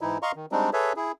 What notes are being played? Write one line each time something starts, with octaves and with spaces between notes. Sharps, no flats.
G#2 E3 D#4 E4
D#5 F5 A#5 C6 C#6
D#3
G3 G#3 C4 D4 D#4
G#4 A4 B4 C#5 E5
E4 G#4